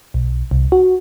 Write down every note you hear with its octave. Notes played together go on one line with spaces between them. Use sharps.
B1
C2
F#4